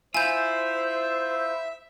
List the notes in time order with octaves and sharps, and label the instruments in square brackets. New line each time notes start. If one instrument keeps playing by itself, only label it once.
[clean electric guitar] E4 F4 [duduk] C5 [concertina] E5 E6 [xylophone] G#5 G6